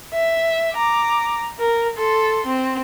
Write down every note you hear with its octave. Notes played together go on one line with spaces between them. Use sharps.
E5
A#5 D6
A#4
A4 C6
C4